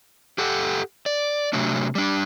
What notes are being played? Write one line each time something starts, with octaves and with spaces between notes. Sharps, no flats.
G4 A4 F#5
D5
C3 F#3 A3 D4
G3 D4